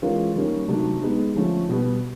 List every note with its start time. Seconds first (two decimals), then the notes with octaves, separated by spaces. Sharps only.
0.02 E3 G#3 C#4 F4 A#4
0.36 D#3 G3 A#3 C#4
0.68 C3 D#3 F#3 A3 D4
1.02 G#3 B3 D#4
1.35 D3 F3 A3 C#4
1.69 B2 G3 B3